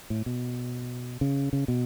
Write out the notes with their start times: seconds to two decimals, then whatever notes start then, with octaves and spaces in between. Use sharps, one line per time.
0.10 A2
0.26 B2
1.21 C#3
1.53 C#3
1.68 B2